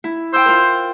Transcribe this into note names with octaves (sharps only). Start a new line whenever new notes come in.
E4
C5 G5 E6
F4 A#4